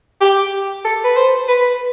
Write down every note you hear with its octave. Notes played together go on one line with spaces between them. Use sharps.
G4
A4
B4
C5
B4